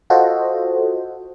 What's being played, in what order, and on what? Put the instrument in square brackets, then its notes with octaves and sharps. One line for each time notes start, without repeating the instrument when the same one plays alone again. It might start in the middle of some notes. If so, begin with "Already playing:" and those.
[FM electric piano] F4 F#4 A4 C5 D#5